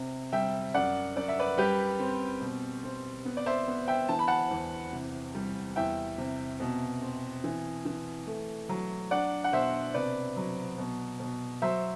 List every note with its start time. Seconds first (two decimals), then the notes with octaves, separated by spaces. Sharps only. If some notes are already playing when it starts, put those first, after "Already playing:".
Already playing: C3
0.33 G3 E5 G5
0.74 F#2 D5 F#5
1.16 F#2 D5
1.28 E5
1.39 B4 D5
1.58 G3 G4 B4
2.00 C4
2.41 B2
2.84 C4
3.25 B3
3.37 D5
3.46 C5 E5
3.68 B3
3.88 E5 G5
4.08 E3 A5
4.19 B5
4.28 F#5 A5
4.51 E2
4.93 C3
5.35 G3
5.76 E2 E5 G5
6.18 C3
6.60 B2
7.02 C4
7.44 E3
7.85 E3
8.27 A3
8.69 F#3
9.11 D4 D5 F#5
9.44 F#5
9.52 B2 C5 E5
9.94 C3 B4 D5
10.37 F#3
10.78 B2
11.20 B2
11.62 F#3 C5 E5